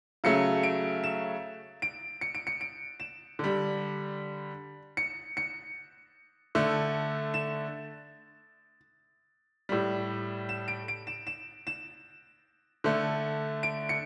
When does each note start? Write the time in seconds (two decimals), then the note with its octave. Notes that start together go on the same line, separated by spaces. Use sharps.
0.24 C#3 F#3 A3 C#7
0.63 D7
1.04 E7
1.82 D7
2.21 C#7
2.35 D7
2.47 C#7
2.61 D7
3.00 E7
3.39 D3 G3
4.97 C#7
5.37 C#7
6.55 D3 A3
7.34 E7
9.69 A2 G3
10.49 E7
10.68 D7
10.88 D7
11.07 E7
11.27 E7
11.67 E7
12.84 D3 A3
13.63 D7
13.89 C#7